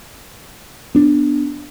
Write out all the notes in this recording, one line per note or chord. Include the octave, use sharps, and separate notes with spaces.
B3 D4